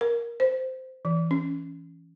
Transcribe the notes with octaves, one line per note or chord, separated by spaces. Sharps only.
A#4
C5
E3
C#4